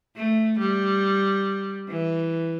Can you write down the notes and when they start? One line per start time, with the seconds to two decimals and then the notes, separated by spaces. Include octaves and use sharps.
0.16 A3
0.59 G3
1.89 E3